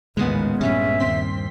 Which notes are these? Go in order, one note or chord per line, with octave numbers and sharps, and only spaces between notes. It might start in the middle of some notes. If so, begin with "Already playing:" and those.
A1 D#2 A#2 C#3 G#3 B3
A#1 G2 A#2 G3 C#4 E5
D#2 C4 C6 B6